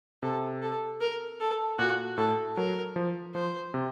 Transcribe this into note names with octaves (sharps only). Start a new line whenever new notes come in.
C3 A4
A4
A#4
A4
A#2 F#4
A2 A4
F#3 A#4
F3
F3 C5
C3